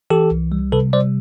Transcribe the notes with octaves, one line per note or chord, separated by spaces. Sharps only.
E3 G4 A4
C2
G3
C3 A4 B4
G3 C5 D5